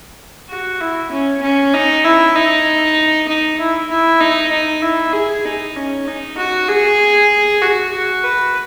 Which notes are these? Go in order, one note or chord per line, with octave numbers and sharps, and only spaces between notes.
F#4
E4
C#4
C#4
D#4
E4
D#4
D#4
E4
E4
D#4
D#4
E4
G#4
D#4
C#4
D#4
F#4
G#4
F#4
F#4
B4